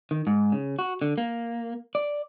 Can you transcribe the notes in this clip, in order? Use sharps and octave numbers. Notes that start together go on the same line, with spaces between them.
D#3
G#2
C#3
F#4
D3
A#3
D5